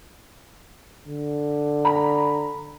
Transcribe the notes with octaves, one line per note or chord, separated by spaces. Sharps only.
D3
A#5 B5